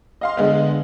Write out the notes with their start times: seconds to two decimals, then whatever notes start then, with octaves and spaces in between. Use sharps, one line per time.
0.21 D#5 F5 C6
0.37 D3 G#3 B3